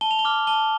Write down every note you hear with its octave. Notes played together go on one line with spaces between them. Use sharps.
A5 G7
F7
G7
D6 F6
A5 G7